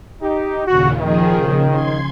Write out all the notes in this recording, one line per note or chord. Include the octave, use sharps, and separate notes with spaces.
D#4 G4
D#2 A#2 C#3 F#4
D#3 F3 G#4
C#3
C6 G#6